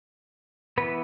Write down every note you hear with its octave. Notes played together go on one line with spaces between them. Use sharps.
E3 B3 B4